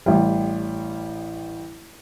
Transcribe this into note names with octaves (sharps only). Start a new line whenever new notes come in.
A1 G3